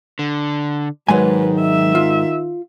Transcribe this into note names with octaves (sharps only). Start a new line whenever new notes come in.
D3
G#2 D#3 F#3 G#3 B4 G#5
E5
F4